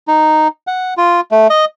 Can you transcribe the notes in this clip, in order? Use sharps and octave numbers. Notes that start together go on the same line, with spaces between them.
D#4
F#5
F4
A3
D#5